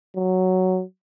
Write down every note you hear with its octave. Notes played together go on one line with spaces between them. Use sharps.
F#3